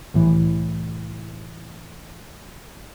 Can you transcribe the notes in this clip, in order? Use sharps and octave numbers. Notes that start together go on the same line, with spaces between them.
C2 A2 E3